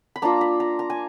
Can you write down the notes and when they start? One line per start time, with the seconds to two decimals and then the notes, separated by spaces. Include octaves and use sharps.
0.16 B5
0.22 A#3 D4 F4 A#5
0.41 B5
0.60 A#5
0.79 A#5
0.90 G#5